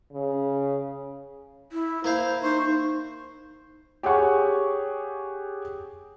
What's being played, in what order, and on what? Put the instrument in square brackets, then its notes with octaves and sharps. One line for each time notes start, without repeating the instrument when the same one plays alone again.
[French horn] C#3
[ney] E4
[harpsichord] A#3 E4 F5 [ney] C5
[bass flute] D#4 [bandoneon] C5 [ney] C#6
[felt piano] G4 G#4 C#5 F#5 C#6